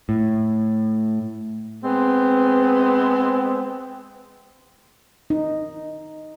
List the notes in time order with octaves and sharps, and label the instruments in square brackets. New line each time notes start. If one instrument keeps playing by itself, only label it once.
[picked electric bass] A2
[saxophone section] G#3 B3 C4
[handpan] D#4